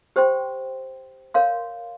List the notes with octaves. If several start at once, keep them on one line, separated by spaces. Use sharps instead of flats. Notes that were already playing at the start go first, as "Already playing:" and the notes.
G4 C5 G5 C6
A#4 C#5 F5 C6